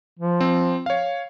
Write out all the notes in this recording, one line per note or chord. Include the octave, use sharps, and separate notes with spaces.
F3
C4
C#5 F5